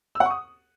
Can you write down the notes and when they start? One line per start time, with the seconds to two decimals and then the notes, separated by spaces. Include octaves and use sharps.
0.15 E6
0.20 F#5
0.25 C#6
0.30 D#6